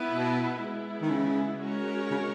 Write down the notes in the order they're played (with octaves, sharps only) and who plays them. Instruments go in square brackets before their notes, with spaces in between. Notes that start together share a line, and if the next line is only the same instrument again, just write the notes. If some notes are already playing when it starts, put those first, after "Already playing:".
Already playing: [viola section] B3 E4 B4
[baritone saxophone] B2
[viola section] G#3 B3 E4
[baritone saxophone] D#3
C#3
[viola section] G#3 C#4 F#4 A#4 C#5
[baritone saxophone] C#3